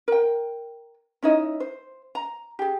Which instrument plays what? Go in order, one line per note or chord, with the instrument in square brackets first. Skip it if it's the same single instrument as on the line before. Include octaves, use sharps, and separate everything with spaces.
[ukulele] A#4 G5
C#4 D#4 E4 D#5
C5
A#5
G4 G#4